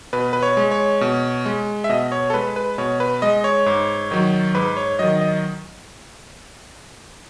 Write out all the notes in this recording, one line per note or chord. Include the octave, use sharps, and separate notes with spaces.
B2 B4
B4
C#5
G#3
C#5
B2
G#3
E5
B2 D#5
C#5
A4
G#3 B4
B4
B2 C#5
B4
G#3 D#5
C#5
G#2
D#3 F#3
G#2 B4
C#5
D#3 F#3 D#5
D#5